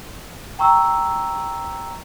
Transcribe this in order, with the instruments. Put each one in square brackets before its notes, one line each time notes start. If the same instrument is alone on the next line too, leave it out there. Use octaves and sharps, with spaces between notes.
[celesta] G5 A#5 C#6 E6